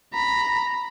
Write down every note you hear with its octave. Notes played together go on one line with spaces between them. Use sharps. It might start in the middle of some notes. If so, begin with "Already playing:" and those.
A#5 B5